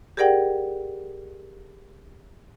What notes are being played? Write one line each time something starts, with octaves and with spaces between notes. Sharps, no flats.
G4 G#4 A#4 D5 F#5 G5